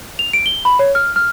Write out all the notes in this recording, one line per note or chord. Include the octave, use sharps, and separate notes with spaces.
F7
D7
G7
B5
C#5
F6
F6